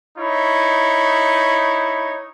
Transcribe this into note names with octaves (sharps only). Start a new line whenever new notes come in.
D#4 E4 C#5